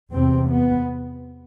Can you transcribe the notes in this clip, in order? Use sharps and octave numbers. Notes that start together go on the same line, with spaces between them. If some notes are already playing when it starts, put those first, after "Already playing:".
E2 C3 C4
B3